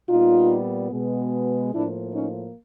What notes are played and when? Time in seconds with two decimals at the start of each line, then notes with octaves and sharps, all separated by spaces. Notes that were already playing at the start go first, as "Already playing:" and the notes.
0.09 A#2 G3 B3 D#4 F4
0.91 B2 G#3 B3
1.73 A2 F3 A#3 D4 E4
2.13 C#4 D#4